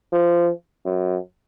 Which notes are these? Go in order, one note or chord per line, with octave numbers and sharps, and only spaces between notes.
F3
F#2